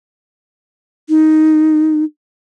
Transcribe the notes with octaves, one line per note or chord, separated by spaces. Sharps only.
D#4